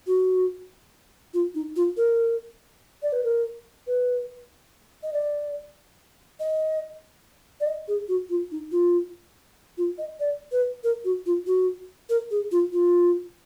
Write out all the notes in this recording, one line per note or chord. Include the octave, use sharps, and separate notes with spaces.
F#4
F4
D#4
F4
A#4
D5
B4
A#4
B4
D#5
D5
D#5
D5
D#5
G#4
F#4
F4
D#4
F4
F4
D#5
D5
B4
A#4
F#4
F4
F#4
A#4
G#4
F4
F4